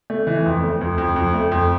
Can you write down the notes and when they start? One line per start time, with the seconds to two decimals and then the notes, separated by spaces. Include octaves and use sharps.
0.10 A3
0.27 E3
0.46 F2
0.63 A3
0.81 F2
0.98 F2
1.16 F2
1.34 A3
1.52 F2